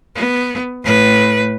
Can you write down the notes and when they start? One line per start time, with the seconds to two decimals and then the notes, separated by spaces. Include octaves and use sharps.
0.15 B3
0.83 A2 B4